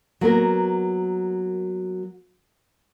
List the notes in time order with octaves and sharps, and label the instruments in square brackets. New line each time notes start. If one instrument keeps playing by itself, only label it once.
[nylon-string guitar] F#3 A#3 B3 A#4